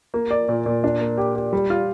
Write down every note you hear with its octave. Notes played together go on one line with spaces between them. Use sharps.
A#3
D5
A#2
A#2
D4
A#3
G4
G4
G3
F4